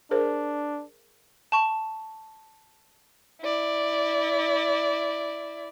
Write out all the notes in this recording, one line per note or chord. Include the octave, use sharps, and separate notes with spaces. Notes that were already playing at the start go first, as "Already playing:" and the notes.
D4 G#4 A#4 C5
A5 C#6
E4 D5